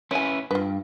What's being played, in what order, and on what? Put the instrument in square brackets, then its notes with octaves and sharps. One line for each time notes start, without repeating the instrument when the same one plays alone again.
[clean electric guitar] C#4 E4 B4 [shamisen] C#5 G#5
[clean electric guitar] G2 [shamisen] F4 B4